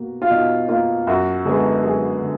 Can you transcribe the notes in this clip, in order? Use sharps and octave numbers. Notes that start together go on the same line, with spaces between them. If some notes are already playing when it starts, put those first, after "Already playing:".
Already playing: B2 A#3 F#4
F4
B2 D#4
A#3 F4
F#2 F#4
D3 G#3 B3 G#4
F#2 G#4
D3